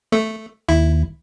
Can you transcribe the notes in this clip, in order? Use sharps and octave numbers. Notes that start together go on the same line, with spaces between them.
A3
D#2 E4